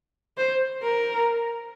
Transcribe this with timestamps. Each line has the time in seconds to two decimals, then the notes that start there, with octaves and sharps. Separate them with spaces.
0.38 C5
0.82 A#4